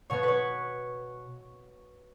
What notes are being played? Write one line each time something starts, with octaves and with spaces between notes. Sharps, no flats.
B2 B3 C#5
B4 C#5